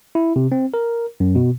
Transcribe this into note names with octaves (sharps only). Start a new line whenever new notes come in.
E4
C3
C4
A#4
F#2
B2